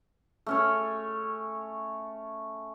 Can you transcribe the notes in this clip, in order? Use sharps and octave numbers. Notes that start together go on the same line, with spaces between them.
A3 C#4 C#5